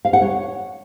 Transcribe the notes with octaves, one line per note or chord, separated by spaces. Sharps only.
F5
F#5
C#5